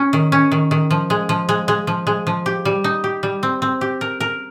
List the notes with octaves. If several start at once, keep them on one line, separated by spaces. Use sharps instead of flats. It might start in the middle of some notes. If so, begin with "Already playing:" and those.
Already playing: C#4
D#3
C#4
D#3
D#3
F3
G#3
F3
G#3
G#3
F3
G#3
F3
G4
G3
D#4
G4
G3
C4
C4
G4
A#4
A#4